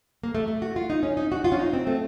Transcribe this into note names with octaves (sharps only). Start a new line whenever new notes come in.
A#3
A3
A3
F#4
F4
D#4
C#4
D#4
F#4
F4
C#4
D#4
C4
A3